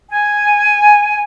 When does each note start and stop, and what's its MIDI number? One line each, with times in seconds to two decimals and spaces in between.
0.09 1.21 80